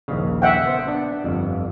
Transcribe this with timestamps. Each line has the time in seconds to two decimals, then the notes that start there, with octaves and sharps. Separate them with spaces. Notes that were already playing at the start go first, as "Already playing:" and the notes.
0.08 A#1 D#2 C#3
0.42 E5 F#5 G5
0.66 B3 C5
0.87 B3 D4
1.24 G1 F2